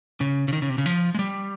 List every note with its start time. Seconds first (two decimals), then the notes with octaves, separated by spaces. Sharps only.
0.21 C#3
0.48 C#3
0.53 D#3
0.62 C#3
0.69 C3
0.78 C#3
0.86 F3
1.15 G#3
1.19 G3